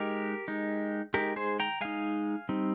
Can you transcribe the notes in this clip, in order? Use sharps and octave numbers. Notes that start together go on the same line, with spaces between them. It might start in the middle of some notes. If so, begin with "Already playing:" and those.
Already playing: G#3 D#4 G4 A#4
G#3 D#4
G#3 D#4 G4 A#4
G#4 C5
G5 A#5
G#3 D#4 F5 G#5
G3 C4 D#4